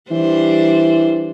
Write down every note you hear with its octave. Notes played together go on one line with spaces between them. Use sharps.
E3 G3 D4 C5